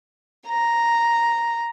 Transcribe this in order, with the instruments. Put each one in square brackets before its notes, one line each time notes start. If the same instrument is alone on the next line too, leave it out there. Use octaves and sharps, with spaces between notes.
[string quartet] A#5